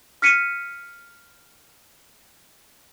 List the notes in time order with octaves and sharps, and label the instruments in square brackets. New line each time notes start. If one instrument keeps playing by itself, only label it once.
[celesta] F6 B6 C#7 D#7